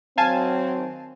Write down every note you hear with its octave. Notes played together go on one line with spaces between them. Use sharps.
D#3 F#3 C4 F5 G#5 A5